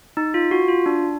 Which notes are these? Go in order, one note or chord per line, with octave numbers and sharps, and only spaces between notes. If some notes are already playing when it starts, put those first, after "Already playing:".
D#4
F4
F#4
F4
D4